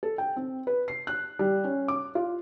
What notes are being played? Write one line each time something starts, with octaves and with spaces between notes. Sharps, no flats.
A4
G5
C4
B4
C7
F#6
G3
C#4
D6
F4